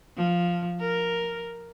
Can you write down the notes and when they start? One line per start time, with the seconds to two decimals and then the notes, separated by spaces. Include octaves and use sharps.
0.17 F3
0.80 A#4